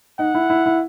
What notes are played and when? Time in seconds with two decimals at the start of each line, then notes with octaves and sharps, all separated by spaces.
0.19 D#4 F#5
0.35 E4
0.50 E4
0.66 E4